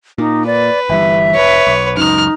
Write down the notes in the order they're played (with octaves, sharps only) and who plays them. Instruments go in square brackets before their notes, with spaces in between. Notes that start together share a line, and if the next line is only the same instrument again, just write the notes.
[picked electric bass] A#2 [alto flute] D#4
[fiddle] B4 [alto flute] D5
[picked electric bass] G1 E3 G3 [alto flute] E5
[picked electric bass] F1 [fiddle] B4 C#5
[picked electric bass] B1
[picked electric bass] C#2 F#2 [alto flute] D#4 [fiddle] F6